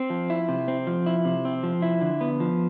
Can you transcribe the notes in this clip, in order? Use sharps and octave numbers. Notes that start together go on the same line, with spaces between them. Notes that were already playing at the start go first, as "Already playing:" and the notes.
Already playing: C4
F3
E4
C3
C4
F3
E4
C3
C4
F3
E4
D3
B3
F3